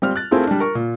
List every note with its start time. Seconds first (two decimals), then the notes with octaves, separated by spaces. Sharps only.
0.02 G3 C4 F4 F6
0.16 F#6 A6
0.31 A3 C4 E4 F4 G#4 A#4
0.47 G3 D4
0.60 A#4 C#6
0.75 A#2